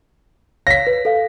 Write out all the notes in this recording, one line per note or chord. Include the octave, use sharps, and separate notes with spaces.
C#5 F5 A#6 B6
B4
A4 F5